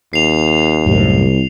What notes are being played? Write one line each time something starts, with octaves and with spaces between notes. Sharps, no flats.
D#2 C7 F7
C2 F#2 A2